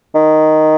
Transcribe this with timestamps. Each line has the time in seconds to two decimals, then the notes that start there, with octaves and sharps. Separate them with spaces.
0.15 D#3